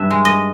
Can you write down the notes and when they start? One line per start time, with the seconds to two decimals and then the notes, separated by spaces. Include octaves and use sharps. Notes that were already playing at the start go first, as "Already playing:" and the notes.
Already playing: G2 E5
0.10 G#3
0.25 D#5